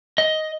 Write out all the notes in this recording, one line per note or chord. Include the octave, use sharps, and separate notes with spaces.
D#5